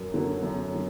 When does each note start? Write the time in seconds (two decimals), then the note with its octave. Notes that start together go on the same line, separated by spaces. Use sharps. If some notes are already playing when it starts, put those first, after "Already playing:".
Already playing: F#2 F#3
0.13 F#2 D3 F#3
0.42 F#2 D3 F#3
0.74 D3